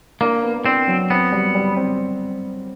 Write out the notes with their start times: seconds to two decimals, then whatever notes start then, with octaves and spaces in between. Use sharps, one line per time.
0.21 A#3 D4
0.43 B3
0.65 C4 D4
0.87 F#3
1.10 B3 C4
1.32 G3
1.55 G3
1.77 C4